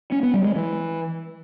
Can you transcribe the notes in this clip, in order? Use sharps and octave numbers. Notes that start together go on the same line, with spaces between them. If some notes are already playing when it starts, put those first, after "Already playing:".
C#4
B3
G3
G#3
E3